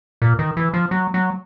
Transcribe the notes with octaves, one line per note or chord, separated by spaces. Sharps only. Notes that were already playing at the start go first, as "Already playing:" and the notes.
A#2
D#3
E3
F3
F#3
F#3